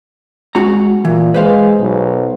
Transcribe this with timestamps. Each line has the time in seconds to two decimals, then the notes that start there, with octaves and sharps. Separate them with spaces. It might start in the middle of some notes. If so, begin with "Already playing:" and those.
0.55 G#3 F#4 A#5
1.05 A#2 E3
1.34 G#3 B4 C5 F5
1.80 B1